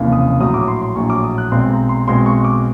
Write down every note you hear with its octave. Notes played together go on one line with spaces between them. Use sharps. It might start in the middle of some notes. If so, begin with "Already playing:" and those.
Already playing: F1 D#2 C#3 E3
D#6
A#1 A2 F#3 D#6
D6
C6
C6
A#1 A2 F#3 C#6
D6
D#6
F#6
B1 B2 G#3 C4 C6
A#5
C6
B1 B2 G#3 C4 C6
C#6
D6